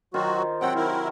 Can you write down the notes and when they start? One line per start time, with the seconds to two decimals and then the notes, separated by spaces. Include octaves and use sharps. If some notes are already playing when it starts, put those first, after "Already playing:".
0.14 D#3 F#3 F4 F#4 C5
0.61 C3 F#3 C4 F#5 G5
0.75 D#3 E4 A#4